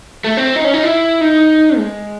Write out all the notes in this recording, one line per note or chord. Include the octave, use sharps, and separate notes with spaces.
A3
C4
D#4
C#4
D#4
E4
D#4
G#3